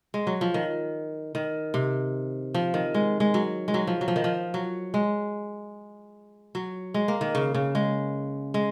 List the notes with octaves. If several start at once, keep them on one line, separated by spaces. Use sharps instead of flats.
G#3
F#3
F3
D#3
D#3
C3
F3
D#3
G#3
G#3
F#3
G#3
F#3
F3
F#3
F3
D#3
F3
F#3
G#3
F#3
G#3
A#3
D#3
C#3
C#3
G#3
G#3